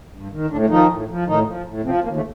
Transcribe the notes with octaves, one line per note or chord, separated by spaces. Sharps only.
G2
D#3
A2 D3 D4
D#3 F3 D#4
A2
F3
A2 D#3 D#4
F3
A2
C3 F3 C4
D#2 A#3
A3